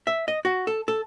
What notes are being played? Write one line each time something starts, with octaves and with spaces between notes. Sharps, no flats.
E5
D#5
F#4
A4
A4